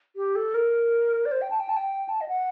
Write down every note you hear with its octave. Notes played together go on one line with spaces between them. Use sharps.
G4
A4
A#4
D5
C5
G5
A5
G5
A5
G5
A5
D#5
F#5